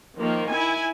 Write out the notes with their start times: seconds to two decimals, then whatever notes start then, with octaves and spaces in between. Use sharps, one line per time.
0.17 D#3 F3 A#3
0.50 E4 G#5